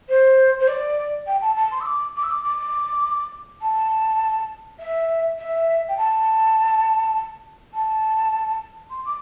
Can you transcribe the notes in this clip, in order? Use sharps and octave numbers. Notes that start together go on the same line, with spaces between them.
C5
C5
D5
G5
A5
A5
C6
E6
D6
D6
E6
D6
D6
A5
E5
E5
G5
A5
A5
C6
D6